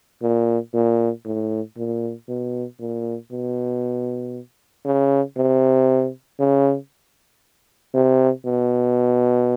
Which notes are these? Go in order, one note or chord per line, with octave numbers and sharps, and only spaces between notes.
A#2
A#2
A2
A#2
B2
A#2
B2
C#3
C3
C#3
C3
B2